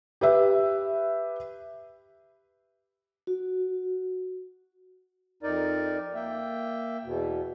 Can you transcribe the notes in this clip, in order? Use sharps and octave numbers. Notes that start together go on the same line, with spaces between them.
G4 B4 E5
F#4
F2 D#4 A#4 D5
A#3 E5 G5
E2 B2